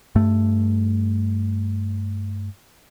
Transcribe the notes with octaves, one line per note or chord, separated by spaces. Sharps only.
G2 A3